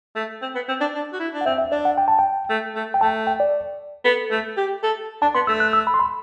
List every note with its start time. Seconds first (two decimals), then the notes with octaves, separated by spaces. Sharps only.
0.15 A3
0.42 C4
0.55 B3
0.68 C4
0.81 D4
0.94 D4
1.13 F#4
1.20 E4
1.34 D4
1.41 F#5
1.46 C4 E5
1.58 E5
1.71 D4 D5
1.85 F#5
1.98 G5
2.08 A5
2.19 G5
2.49 A3
2.75 A3
2.94 G5
3.01 A3 A5
3.27 G5
3.40 D5
4.05 B3 A4
4.31 A3
4.57 G4
4.83 A4
5.22 D4 A5
5.35 B3 C6
5.47 A3 E6
5.60 F#6
5.73 E6
5.87 B5
5.94 C6
5.99 B5